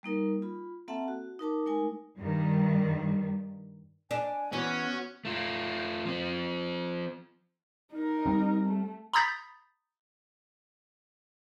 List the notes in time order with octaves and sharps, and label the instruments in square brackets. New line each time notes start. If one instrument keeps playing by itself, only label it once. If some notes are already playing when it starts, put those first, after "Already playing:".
[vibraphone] G3 A#3 D#4 A#4
F4 B5
A#3 C4 A4 E5 F#5 A5
F#4
D#4 A#4 A5 D6
G#3 A3 D#4 A#4 G#5
[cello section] G2 D#3 G3
[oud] D4 [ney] G#5
[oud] E3 [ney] B3 [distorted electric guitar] C#4 [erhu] F#4
[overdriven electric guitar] A3 F4
F3 C4
[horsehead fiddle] D#4 A#4
[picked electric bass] G3 C4
[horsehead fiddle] A3
[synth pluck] A#5 B5 D#6 G6 A6 B6